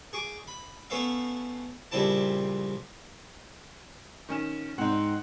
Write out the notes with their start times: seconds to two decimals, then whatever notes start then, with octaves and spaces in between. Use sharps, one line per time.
0.13 G#4 C#6 D6
0.48 B5
0.90 A3 B3 C#4 E5 F5
1.91 A#1 C#3 G3 C4 E4 A5
4.29 D#3 C#4 E7
4.78 G#2 C4 D#4 F#5